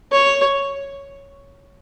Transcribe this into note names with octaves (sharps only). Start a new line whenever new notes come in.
C#5